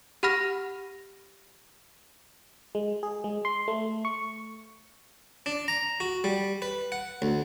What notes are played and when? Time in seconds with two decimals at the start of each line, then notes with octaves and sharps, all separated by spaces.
0.23 G4 F#5 B5 F6 A#6
2.75 G#3
3.03 G#4
3.24 G#3
3.45 C6
3.68 A3
4.05 C#6
5.46 D4
5.68 A#5
6.00 F#4
6.24 G3
6.62 B4
6.92 F#5
7.22 D2